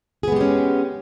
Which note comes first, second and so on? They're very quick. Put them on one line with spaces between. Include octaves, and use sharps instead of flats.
G#4 B3 G#3 G4 C#4